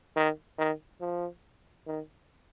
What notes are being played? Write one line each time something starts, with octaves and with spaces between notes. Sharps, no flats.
D#3
D#3
F3
D#3